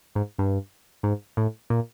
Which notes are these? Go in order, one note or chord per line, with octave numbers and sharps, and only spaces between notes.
G#2
G2
G#2
A2
A#2